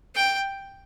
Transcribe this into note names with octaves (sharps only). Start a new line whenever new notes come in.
G5